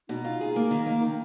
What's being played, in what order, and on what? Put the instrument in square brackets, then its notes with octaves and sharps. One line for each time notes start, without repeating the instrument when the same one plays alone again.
[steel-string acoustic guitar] B2 [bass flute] D#4
[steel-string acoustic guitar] F4
G#4
A#3
D#3
A#3
D#3